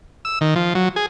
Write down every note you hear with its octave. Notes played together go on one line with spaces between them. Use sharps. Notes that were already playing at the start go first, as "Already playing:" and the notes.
E6
D#3
F3
F#3
G#4